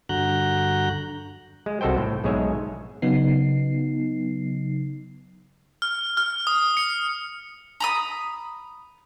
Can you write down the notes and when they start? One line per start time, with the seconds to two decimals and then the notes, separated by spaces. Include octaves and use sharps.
0.09 G2 D3 F#4 A#5 F#6 G6
1.66 G#3
1.81 C2 F#4 A4 C5 G5
1.98 A2
2.24 B1 G#2 G#3 G#4 C#5 E5
3.02 C#3 F#3 B3 D#4 C7
5.82 F6
6.17 F6
6.47 D#6
6.77 C#7
7.80 A#5 B5 D#6